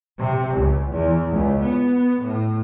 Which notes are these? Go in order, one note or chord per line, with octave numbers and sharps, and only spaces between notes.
C3
C#2
E2
C#2
B3
A2